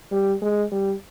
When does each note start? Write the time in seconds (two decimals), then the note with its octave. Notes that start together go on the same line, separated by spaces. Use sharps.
0.12 G3
0.42 G#3
0.72 G3